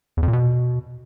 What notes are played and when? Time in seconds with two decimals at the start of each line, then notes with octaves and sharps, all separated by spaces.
0.17 E2
0.23 F2
0.28 A#2
0.33 B2